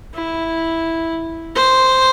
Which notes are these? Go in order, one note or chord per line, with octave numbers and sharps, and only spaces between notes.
E4
C5